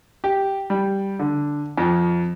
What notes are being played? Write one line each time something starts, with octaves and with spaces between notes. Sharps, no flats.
G4
G3
D3
F2